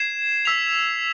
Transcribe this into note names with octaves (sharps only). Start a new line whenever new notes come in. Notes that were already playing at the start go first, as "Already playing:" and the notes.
Already playing: G#6 C7 E7
E6 B6 F7